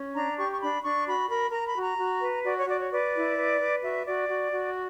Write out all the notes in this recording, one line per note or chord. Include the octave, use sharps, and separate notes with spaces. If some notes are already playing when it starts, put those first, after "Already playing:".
Already playing: C#4
D4 A#5
G4 C#6
C#6
D4 B5
D4 C#6
F#4 B5
A#4 B5
A#4 A#5
B5
F#4 A#5
F#4
B4
F#4 D5
C#5
F#4 D5
C#5
B4 D5
E4
B4
B4
F#4 E5
F#4 D5
F#4
F#4